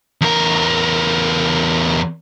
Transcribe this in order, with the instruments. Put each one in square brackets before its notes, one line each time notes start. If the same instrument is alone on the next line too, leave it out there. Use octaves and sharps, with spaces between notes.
[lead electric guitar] E2 A#4